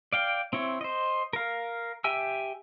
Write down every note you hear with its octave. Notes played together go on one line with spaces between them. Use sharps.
D5 F5 G5
C4 E4 C#5
C5 D#5
A#4 F5
G4 E5 G5 G#5 E6